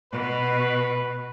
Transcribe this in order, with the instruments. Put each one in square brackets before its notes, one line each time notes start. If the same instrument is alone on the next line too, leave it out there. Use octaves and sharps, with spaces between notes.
[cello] B2 [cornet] B4